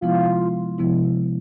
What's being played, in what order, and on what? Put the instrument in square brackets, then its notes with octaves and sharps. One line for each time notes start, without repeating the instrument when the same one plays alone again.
[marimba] C3 F3 G#3 B3 E4 [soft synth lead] F4
[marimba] C3 F3 G#3 B3 E4